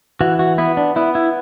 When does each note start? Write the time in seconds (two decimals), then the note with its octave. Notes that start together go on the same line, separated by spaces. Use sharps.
0.21 E3 F#4
0.39 F#4
0.58 B3 E4
0.77 D4
0.96 B3 E4
1.15 E4